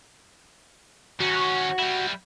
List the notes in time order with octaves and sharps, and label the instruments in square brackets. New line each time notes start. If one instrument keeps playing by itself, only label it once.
[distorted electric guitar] D#3 C#4 [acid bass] F#4
[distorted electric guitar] G3 E4